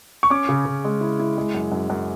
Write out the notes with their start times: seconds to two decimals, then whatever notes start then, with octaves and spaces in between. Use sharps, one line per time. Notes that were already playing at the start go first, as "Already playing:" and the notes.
0.23 C#6
0.30 C#4 D6
0.49 C#3
0.66 C#3
0.84 G#3
1.01 E4
1.19 E4
1.37 G#3
1.54 F#2
1.72 F#2
1.90 F#2